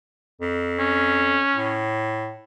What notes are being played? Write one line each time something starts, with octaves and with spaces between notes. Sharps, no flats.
F2
C#4
A2